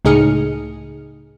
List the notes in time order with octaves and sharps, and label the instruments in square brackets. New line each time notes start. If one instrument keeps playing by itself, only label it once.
[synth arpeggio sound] C#2 A2 D#4 G#4 F6 C#7